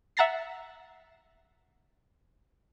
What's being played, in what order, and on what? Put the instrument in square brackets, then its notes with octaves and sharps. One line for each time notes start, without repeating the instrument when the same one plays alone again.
[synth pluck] E5 F#5 A#5 A6 A#6 C7